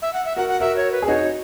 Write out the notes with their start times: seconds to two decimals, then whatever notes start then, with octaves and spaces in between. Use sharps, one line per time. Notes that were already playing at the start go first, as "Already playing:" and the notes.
0.02 E5
0.13 F#5
0.25 E5
0.37 F#4 A#4 F#5
0.49 F#5
0.60 F#4 A#4 E5
0.76 C#5
0.92 B4
1.02 G#4
1.08 D#4 F#4 C#5